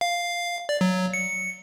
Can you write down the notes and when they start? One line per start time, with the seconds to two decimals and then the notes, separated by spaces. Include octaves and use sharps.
0.01 F5
0.69 D5
0.81 F#3
1.14 C#7